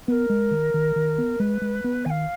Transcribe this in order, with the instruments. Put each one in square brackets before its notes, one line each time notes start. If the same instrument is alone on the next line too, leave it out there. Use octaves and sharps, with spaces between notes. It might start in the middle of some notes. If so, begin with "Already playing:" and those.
[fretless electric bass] B3 [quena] A#4 B4
[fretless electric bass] G#3
D#3
D#3
D#3
B3
[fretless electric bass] G#3 [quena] B4
[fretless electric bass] G#3
B3
[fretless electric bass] D#3 [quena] F5 G#5